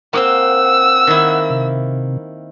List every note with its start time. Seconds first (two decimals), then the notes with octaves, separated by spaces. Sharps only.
0.13 A#3 C4 C5 F#5 E6
1.07 D#3 A#3 E4
1.50 C3